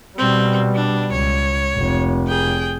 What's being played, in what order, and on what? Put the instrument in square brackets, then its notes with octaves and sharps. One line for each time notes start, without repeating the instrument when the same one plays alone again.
[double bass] B2 G3 [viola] C4
[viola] D4
[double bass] C#2 [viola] C#5
[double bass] F1
[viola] G#4 G5